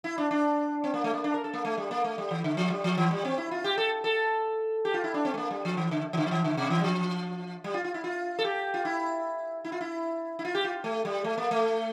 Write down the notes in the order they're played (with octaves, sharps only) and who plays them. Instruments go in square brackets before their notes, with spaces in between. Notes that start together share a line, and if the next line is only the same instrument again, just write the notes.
[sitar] E4
D4
D4
C4
A#3
A3
A#3
D4
A#4
A4
A#3
A3
G3
A#3
A3
G3
E3
D3
F3
G3
F3
E3
G3
C4
E4
F4
G4
A4
A4
G4
F4
E4
D4
C4
A3
A#3
G3
F3
E3
D3
E3
D3
F3
E3
D3
C3
E3
G3
F3
G3
F4
F4
E4
F4
A4
G4
F4
E4
E4
F4
E4
E4
F4
G4
F4
A3
G3
A3
A#3
A3